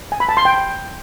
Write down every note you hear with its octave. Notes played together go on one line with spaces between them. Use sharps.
G#5
B5
A5
C6
G5